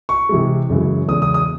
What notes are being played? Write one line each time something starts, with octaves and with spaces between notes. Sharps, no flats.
C#6
C3 E3 G#3
F#2 C#3 E3 G#3
E2 C#3 E3 G#3 D#6
D#6
D#6